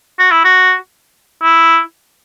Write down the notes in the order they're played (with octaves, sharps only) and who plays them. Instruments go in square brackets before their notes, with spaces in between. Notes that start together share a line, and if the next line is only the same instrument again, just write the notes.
[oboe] F#4
E4
F#4
E4